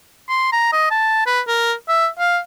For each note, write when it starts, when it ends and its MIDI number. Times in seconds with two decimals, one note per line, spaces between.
0.29 0.49 84
0.53 0.72 82
0.73 0.90 75
0.91 1.24 81
1.27 1.41 71
1.48 1.73 70
1.89 2.07 76
2.19 2.39 77